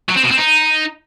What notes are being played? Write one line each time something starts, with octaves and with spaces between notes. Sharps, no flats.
F#3
C4
B2
C4
D#4